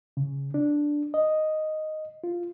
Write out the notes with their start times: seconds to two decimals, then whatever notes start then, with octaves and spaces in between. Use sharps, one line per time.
0.17 C#3
0.54 D4
1.14 D#5
2.24 F4